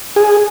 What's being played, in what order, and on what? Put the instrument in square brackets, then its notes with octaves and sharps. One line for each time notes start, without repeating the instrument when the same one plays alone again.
[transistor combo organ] G#4